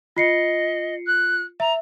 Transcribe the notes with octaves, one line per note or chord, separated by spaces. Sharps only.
F4 D#5 C7 C#7
F#6
E5 A#5